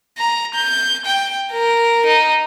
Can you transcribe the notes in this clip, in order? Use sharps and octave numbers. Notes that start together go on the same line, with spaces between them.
A#5
G6
G5
A#4
D#4